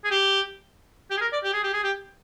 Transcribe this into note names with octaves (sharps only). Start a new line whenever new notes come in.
G#4
G4
G4
G#4
A#4
D5
G4
G#4
G4
G#4
G4